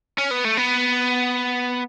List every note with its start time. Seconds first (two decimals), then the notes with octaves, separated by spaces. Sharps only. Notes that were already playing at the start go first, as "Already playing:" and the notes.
0.18 C#4
0.31 B3
0.45 A3
0.57 B3